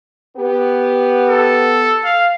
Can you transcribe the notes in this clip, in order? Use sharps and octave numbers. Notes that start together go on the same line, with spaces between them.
B3 G4
A4
F5